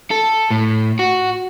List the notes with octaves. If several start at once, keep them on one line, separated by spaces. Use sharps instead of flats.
A4
A2
F#4